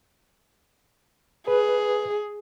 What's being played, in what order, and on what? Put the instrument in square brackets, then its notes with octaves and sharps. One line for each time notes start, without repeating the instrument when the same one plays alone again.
[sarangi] G#4 [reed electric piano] B4